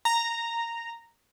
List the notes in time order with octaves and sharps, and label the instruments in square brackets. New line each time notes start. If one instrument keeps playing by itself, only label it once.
[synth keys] A#5